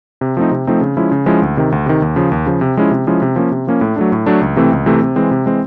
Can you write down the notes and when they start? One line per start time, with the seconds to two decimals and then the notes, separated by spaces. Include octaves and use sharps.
0.21 C3
0.37 F3 A3 C4 D#4
0.51 C3
0.67 F3 A3 C4 D#4
0.81 C#3
0.97 F3 G#3 C#4 E4
1.11 C#3
1.26 F3 G#3 C#4 E4
1.42 D2
1.57 C3 D#3
1.72 D2
1.86 C3 D#3
2.02 D#2
2.16 C#3 F3
2.32 D#2
2.46 C#3 F3
2.61 C3
2.77 F3 G#3 C#4 E4
2.91 C3
3.07 F3 G#3 C#4 E4
3.22 C3
3.36 F3 A#3 C#4
3.52 C3
3.67 F3 A#3 C#4
3.81 A2
3.96 F#3 A3 D4
4.12 A2
4.26 F#3 A3 D4
4.41 C#2
4.56 C3 E3 A3 C4
4.72 C#2
4.86 C3 E3 A3 C4
5.02 C3
5.16 E3 G#3 C4
5.31 C3
5.46 E3 G#3 C4